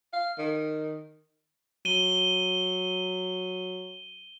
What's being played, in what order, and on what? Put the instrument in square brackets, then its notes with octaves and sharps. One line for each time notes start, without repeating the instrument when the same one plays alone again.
[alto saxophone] F5
D#3
[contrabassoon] F#3 [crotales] D#7 G7